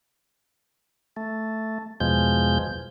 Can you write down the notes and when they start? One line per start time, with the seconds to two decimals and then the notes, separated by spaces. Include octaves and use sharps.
1.17 A3
2.00 E2 B2 F3 G#3 G6